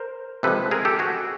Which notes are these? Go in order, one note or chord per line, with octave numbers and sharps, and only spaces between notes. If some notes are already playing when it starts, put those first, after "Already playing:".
Already playing: A#4 C5
C3 F3 G#3 A4 B4
G#4 A#4
G4 A4
F#4 G#4